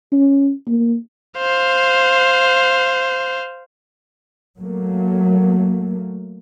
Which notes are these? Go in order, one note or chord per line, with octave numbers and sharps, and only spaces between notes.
C#4
A#3
C5 F5
F#3 A3 A#3